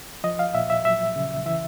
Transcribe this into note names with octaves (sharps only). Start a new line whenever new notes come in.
F3 D#5
F5
A#2 E5
E5
F#3 E5
C#3
E3 E5